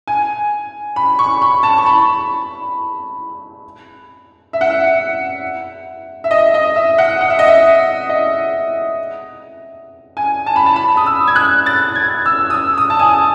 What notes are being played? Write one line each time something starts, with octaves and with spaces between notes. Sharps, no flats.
G#5
B5
C#6
B5
A5
C#6
B5
E5
F#5
E5
E5
D#5
D#5
E5
F#5
F#5
E5
D#5
E5
D#5
G#5
A5
B5
A5
B5
D#6
E6
G#6
F#6
A6
G#6
E6
D#6
E6
D#6
A5
G#5